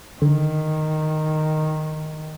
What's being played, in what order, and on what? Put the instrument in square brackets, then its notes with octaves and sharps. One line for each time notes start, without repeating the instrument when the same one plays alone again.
[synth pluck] D3 [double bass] D#3